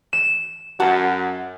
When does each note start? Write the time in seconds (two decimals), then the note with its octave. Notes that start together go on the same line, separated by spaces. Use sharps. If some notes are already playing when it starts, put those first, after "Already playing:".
0.13 E7
0.80 F#2 F#4 F#5 A5